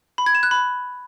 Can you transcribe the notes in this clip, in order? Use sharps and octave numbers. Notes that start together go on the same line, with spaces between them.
B5
G#6
E7
F#6
B5